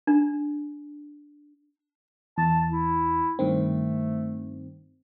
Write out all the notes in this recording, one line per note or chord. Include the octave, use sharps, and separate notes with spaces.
D4
E2 A5
E4
G2 D#3 A3 C4